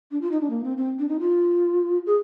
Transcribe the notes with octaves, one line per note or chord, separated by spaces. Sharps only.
D4
F4
D#4
D4
A#3
C4
C4
D4
D#4
F4
G#4